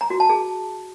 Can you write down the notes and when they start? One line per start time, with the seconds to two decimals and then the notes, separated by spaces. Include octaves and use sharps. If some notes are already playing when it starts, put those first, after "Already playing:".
0.01 A#5
0.10 F#4
0.20 A5
0.30 G#4